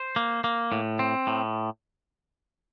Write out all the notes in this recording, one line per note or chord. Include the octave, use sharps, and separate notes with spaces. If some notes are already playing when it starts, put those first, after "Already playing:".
Already playing: C5
A#3
A#3
A2
C4
A2